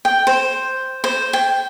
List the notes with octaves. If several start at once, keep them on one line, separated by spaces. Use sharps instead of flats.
G5
C5
C5
G5